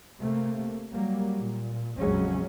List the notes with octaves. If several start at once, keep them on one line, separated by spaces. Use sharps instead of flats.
C3 A3 A#3
F#3 G3 A#3
A#2
A#1 F2 C#3 F#3 G#3 C#4